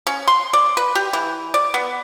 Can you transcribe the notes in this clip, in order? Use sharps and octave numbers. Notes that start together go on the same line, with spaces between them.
C#4
C6
D5
B4
G4
E3
D5
B3